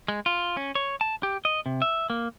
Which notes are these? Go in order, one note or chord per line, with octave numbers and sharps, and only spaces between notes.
G#3
F4
C#4
C#5
A5
G4
D#5
C3
E5
A#3